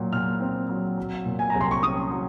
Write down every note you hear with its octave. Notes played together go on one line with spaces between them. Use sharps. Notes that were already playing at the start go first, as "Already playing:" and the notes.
Already playing: A#2 F#3
A#2 F6
C4
F#3
F#3
A#2
G#5
C2 A#5
C6
C#6
C#4 D#6
F#3